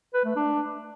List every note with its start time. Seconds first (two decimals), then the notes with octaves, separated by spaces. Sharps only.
0.14 B4
0.25 A3
0.36 D4